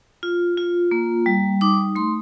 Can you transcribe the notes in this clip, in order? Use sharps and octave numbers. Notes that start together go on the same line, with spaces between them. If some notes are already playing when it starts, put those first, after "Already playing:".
F4
F4
A#3
G3
D#4 D6
A3 C6